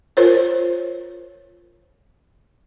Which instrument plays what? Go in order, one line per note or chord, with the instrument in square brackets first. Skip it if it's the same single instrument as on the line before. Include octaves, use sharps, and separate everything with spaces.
[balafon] F4 A#4 C5 C#5